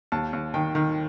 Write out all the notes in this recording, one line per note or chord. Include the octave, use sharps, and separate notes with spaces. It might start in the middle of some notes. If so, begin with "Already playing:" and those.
D#2 A5
D#2
D#3 G5
D#3